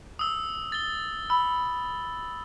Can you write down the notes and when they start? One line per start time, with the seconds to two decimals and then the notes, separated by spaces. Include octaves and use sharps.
0.19 D#6 E6
0.72 A6 G7
1.30 B5 E6